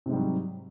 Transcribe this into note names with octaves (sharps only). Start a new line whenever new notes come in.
G#2 C3 F#3 G3